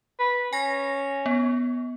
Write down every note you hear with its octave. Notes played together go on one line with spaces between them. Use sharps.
B4
C#4 G#5 A#6
B3